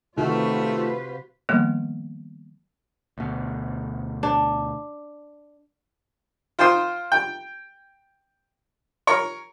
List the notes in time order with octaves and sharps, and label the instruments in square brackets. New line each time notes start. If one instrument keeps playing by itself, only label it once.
[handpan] C3 F#4 [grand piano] D#3 [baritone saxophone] A3 [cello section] F4 B4 C5
[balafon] D#3 F3 G3 A#3 B3
[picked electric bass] D2 B2
[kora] D4
[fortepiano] F4 C5 G5 C6 D#6
G5
A#4 C#5